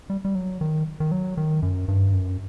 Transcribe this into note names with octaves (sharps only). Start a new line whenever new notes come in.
G3
G3
F#3
D#3
D#3
F#3
D#3
F#2
G2
F#2